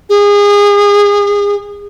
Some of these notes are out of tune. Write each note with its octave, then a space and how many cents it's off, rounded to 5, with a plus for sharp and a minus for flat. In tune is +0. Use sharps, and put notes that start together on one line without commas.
G#4 -30